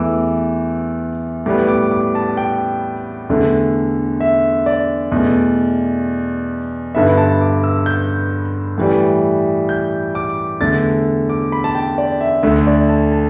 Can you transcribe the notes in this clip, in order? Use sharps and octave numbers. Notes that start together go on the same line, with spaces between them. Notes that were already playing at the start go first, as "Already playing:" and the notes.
Already playing: E2 E3 A3 D6 E6
A2 G3 B3 D6
D6
D6
A5
G5
E2 D3 A3
E5
D5
E2 B2 A3
G2 D3 B3 E5
A5
D6
E6
G6
A2 E3 G3
G6
D6
E2 D3 A3 A6
D6
B5
A5
G5
D5
E5
D2 D3 A3 E5
D5
A5
A5